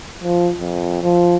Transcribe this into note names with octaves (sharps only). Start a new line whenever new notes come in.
F3
F2
F3